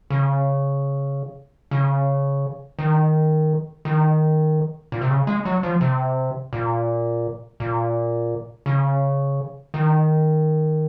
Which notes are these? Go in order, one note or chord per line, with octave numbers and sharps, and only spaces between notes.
C#3
C#3
D#3
D#3
A#2
C3
C#3
G#3
F#3
F3
C3
A#2
A#2
C#3
D#3